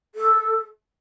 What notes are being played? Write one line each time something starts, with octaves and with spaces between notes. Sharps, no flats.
A4